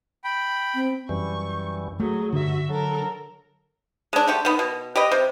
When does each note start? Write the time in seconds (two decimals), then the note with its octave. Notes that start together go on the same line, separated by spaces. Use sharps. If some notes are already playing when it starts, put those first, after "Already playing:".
0.24 G5 B5
0.75 C4
1.09 F#2 E3 G3 C#6
2.00 F#3 A3 G#4
2.33 G2 D3 F#4 E5
2.70 F#3 A4 A#4
4.13 G#3 D4
4.28 D3 A3 G4
4.45 D#3 B3
4.59 B2
4.96 G4 B4 D#5
5.11 C3